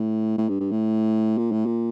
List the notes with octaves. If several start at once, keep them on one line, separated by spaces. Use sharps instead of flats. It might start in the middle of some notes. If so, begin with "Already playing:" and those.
Already playing: A2
A2
G2
G2
A2
A#2
A2
A#2